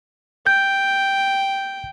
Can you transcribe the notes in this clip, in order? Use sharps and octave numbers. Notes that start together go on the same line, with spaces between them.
G5 G6